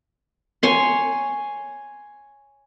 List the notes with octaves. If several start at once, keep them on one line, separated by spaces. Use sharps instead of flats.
C#5 G#5 C6